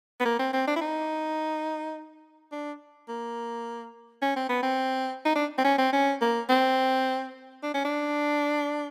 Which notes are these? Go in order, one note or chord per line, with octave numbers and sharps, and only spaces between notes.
B3
A#3
C4
C4
D4
E4
D#4
D4
A#3
C#4
C4
B3
C4
D#4
D4
C4
C#4
C4
C#4
A#3
C4
D4
C#4
D4